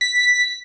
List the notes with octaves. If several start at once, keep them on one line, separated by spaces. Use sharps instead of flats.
B6